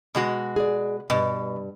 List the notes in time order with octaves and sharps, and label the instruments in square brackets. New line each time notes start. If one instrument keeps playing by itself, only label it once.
[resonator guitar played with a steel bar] B2 G#3 F#4
[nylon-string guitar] G#4 D5
[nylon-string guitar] G2 G3 [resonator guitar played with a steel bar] B2